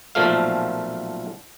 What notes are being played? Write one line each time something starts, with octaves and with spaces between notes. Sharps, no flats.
B1 A#2 F3 A3 F5